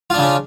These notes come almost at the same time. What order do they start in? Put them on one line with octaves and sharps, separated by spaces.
F4 D4 C#3 C#4